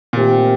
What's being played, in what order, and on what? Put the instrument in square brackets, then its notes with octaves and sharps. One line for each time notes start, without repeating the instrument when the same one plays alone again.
[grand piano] A#2 [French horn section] D#3 A3 C4 G4